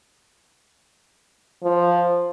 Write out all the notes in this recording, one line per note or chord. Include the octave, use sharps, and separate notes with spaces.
F3